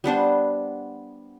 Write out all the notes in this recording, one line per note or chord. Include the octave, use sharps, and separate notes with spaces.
G3 B3 D4 C5